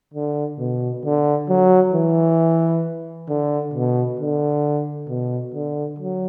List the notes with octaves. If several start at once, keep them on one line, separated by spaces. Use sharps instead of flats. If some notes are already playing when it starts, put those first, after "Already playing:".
D3
B2
D3
F#3
E3
D3
B2
D3
B2
D3
F#3